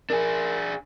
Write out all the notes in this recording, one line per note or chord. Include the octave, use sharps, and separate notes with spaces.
D4 G#4 A#4